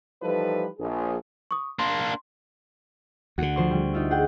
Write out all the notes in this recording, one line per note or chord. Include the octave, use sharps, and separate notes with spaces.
E3 F3 G3 D#4 A4 B4
A#1 G#4
C#6 D#6
A#3 D4 C6
D2 D3 F#4
F3 C5 C#6
G3
D#4 F4 E5
G#4 F#5 G5